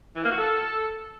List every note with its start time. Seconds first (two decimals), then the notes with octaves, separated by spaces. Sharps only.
0.16 E3
0.23 A#3
0.31 F#4
0.38 A4